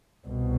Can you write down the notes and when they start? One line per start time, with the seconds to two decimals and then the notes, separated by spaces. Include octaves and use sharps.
0.25 C2 B2